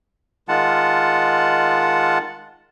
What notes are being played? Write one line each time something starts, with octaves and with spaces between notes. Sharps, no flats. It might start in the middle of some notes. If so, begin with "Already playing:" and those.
D#3 G#3 F4 F#5 A5